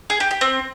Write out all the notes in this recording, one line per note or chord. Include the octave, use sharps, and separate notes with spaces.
G#4
G4
G4
C4